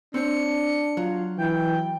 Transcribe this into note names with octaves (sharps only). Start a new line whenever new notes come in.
C4 D4 C5 C#5 C#7
F#3 F4
E3 G5